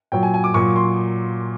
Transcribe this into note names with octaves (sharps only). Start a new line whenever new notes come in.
A#2 F#3 G5
G#5
G#5
D6
A#2 F#3 C#6
C6